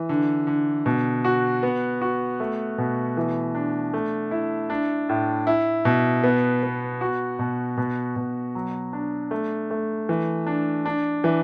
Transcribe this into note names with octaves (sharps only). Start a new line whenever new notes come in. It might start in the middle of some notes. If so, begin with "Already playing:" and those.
Already playing: E3
D3
D3
B2
F#4
B3
F#4
A3
B2
E3
D4
A3
E4
D4
A2
E4
B2
B3
B3
F#4
B2
B2
B2
F#3
D4
A3
A3
E3
D4
D4
E3